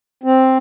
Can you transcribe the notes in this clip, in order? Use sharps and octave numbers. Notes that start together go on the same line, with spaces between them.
C4